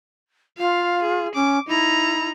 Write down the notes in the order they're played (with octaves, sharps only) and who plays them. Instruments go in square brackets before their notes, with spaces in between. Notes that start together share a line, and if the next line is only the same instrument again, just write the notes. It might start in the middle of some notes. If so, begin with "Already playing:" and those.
[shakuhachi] F4 [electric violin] F5
[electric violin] G#4
[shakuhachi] C#4 [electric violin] D6
[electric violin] D#4 A#5 [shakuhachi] E4